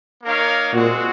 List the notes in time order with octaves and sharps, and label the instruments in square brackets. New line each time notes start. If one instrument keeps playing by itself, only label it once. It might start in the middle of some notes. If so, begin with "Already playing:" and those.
[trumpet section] A#3 D#4 A#4 C#5 F5
[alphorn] A#2 [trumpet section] G#3 C4 F#4